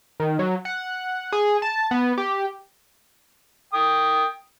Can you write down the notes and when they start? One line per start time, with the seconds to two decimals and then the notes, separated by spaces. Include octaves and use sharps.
0.20 D#3
0.39 F#3
0.65 F#5
1.32 G#4
1.62 A5
1.91 B3
2.18 G4
3.73 G5 D#6